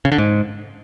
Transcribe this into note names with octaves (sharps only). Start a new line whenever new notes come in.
C#3
D3
G#2